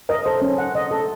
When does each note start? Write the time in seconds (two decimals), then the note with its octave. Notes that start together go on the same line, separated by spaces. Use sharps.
0.09 A#4 D#5
0.25 A4 C5
0.42 C#4
0.58 F#5
0.75 D#5
0.91 A4